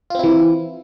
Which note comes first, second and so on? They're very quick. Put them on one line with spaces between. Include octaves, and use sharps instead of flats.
F4 C4 E4 E3